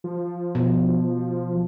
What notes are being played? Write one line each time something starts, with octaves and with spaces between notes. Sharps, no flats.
F3
B2